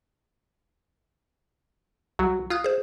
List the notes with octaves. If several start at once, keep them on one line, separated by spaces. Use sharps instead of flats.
C2 F#3 F#4
F4 D#6 F#6 G#6
G#4 C5